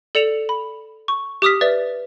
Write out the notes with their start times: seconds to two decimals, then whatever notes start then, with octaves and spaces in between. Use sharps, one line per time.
0.15 A4 D5 C#7 E7 F7
0.49 B5
1.08 C#6
1.42 G4 D6 D#6 F6 B6
1.61 B4 D5 E5 A6